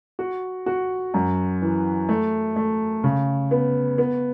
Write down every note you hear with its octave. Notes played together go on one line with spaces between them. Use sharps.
F#4
F#4
F#2
E3
A3
A3
C#3
B3
B3